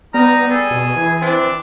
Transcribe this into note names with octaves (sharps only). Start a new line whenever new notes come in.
G3 B3 D#4 A#5
G#4 A4
B2
E3 G#5
C4 D4